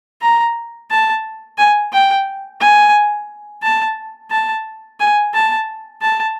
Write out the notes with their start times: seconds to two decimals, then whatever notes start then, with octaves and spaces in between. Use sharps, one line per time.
0.22 A#5
0.91 A5
1.58 G#5
1.93 G5
2.61 G#5
3.63 A5
4.31 A5
5.00 G#5
5.34 A5
6.01 A5